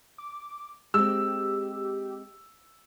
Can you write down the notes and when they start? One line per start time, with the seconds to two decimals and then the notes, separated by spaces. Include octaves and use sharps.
0.18 D6
0.94 G#3 C4 G4 E6